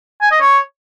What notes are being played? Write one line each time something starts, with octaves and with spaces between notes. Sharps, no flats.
G#5
D#5
C#5